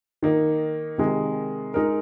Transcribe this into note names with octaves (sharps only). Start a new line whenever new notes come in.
D#3 A#3 D#4
C3 D#3 G#3
G#3 D#4 A#4